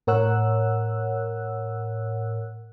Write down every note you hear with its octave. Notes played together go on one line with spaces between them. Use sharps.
A2 A#4 C#5 F#5 E6 F#6